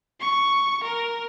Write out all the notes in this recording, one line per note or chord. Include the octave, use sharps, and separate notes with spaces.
C#6
A#4